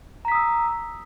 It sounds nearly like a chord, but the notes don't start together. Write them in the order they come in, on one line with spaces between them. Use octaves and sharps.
A#5 B6 D#6 E6